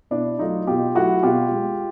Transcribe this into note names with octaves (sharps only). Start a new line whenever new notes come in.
B2 D4 E4
F#3 A3 D#4 F4
B2 F4 G4
F#3 A3 E4 F#4
B2 F4 G4
G#3